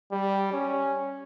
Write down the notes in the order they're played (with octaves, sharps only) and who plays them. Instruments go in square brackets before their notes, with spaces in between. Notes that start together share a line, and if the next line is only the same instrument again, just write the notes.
[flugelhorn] G3
C#4